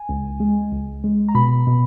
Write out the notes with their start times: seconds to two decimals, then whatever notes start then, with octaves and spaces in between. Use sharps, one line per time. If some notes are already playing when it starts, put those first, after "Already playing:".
Already playing: G#5
0.09 C#2
0.40 G#3
0.72 C#2
1.04 G#3
1.28 A#5
1.35 B2 B5
1.67 B2